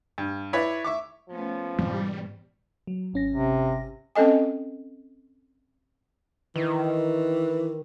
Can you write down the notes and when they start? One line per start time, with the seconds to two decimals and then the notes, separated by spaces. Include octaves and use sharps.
0.18 G2
0.53 E4 B4 C#5 D5 B5
0.84 E5 C#6 D6
1.29 F3 A3 B3 C#4
1.79 G#2 B2 E3 G3 C#4
2.87 F#3
3.14 G#1 C#4 A#6
3.30 C3
4.16 C4 C#4 A4 D#5 G#5
6.56 D#3 E3